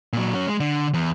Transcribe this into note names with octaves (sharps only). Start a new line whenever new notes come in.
A#2 F#3
F#3 C#4
G#3
D3
E2